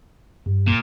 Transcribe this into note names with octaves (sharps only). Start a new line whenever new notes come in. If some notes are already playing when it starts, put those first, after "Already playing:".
G2
A#2